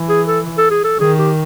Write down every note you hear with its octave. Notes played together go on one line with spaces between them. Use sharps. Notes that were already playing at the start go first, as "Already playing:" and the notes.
Already playing: E3
G#4
A4
A4
G#4
A4
D#3 G#4
G4